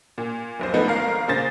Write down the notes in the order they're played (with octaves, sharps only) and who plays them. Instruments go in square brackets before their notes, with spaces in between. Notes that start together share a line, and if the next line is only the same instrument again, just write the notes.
[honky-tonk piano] A#2
F1 B1 C5
F3 A3 B3 D#4
G#1 A#4 F5
A#2 C#3 C5 A6 A#6